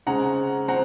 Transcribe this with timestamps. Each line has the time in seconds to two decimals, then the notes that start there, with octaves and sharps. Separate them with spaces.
0.07 C#3 G#3 C4 F#5 A#5
0.68 C4 F#5 A#5